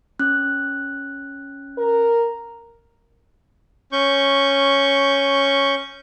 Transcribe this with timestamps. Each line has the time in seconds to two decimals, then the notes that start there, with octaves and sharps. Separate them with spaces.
0.19 C#4 F#6
1.78 A#4
3.92 C#4 C#6 G6